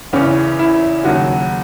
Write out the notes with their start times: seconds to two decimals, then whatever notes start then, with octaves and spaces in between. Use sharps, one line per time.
0.13 E2 C#3 E3 C#4
0.59 E4
1.04 D#2 C#3 F#3 F#4